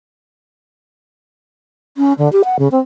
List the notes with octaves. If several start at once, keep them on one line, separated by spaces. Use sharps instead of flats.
C#4
D3
G4
F#5
C#3
C4